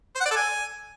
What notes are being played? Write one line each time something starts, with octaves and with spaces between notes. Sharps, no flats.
C5
F#5
D5
A4
G#5